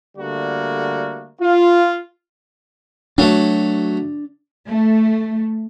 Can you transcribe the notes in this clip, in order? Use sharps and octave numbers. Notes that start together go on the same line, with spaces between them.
D3 G3 A3 A#3 F#4
F4
F#3 A3 D4
A3